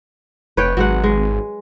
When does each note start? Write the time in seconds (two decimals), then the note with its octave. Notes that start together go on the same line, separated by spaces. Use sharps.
0.57 F1 B4 C#5 G5
0.77 G#1 F#3 G#3 F#5
1.03 G#3